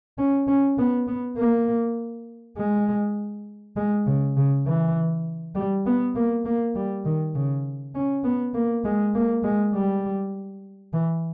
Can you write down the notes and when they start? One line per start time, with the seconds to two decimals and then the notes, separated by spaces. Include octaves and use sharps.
0.18 C#4
0.48 C#4
0.78 B3
1.07 B3
1.38 A#3
2.57 G#3
3.76 G#3
4.06 C#3
4.36 C#3
4.66 E3
5.55 G3
5.86 B3
6.15 A#3
6.45 A#3
6.75 G3
7.05 D#3
7.35 C#3
7.95 C#4
8.24 B3
8.54 A#3
8.84 G#3
9.14 A#3
9.44 G#3
9.74 G3
10.93 E3